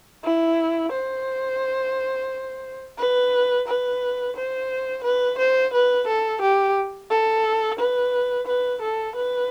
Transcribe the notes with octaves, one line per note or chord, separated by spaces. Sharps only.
E4
C5
B4
B4
C5
B4
C5
B4
A4
G4
A4
B4
B4
A4
B4